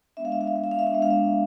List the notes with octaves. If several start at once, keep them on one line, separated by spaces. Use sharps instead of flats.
G#3 B3 D4 E5
F5
E5
F5
E5
F5
E5
F5
E5
F5
G#3 B3 D4 E5
F5
E5